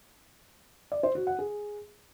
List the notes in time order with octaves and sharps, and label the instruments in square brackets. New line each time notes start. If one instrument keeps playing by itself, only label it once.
[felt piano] D5
C5
F#4
F#5
G#4